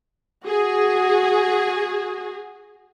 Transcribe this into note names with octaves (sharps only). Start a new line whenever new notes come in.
F#4 G#4